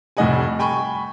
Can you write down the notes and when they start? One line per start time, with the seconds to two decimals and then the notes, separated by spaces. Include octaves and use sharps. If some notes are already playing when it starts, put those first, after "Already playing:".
0.17 F1 A2 G3 D#5 F#5 G#5
0.59 G5 G#5 B5 C#6